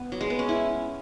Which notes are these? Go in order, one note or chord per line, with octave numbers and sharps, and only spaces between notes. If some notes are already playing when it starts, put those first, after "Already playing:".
Already playing: B3
F#3
G#3
B3
C#4
E4